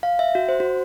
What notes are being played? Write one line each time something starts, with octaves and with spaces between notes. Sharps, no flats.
F5
E5
F#4
C5
F#4